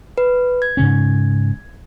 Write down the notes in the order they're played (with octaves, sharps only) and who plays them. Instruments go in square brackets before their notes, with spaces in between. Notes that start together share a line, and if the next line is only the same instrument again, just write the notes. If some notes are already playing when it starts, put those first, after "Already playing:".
[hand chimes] B4
G#6
[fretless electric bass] G#2 C#3 C#4